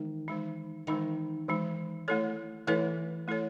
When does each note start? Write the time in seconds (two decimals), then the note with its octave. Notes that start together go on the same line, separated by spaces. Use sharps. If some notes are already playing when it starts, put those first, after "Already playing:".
Already playing: D#3 E3 G#3
0.28 E3 G#3 D#4
0.87 D#3 E3 G#3 D#4
1.48 E3 G#3 D#4
2.08 A3 E4 A4 C#5
2.67 E3 A3 E4 A4 C#5
3.28 A3 E4 A4 C#5